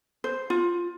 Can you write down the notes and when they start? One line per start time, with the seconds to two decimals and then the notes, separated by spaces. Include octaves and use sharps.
0.24 C5
0.50 F4